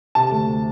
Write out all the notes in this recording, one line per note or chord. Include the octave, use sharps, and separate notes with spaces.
C3 A5
D2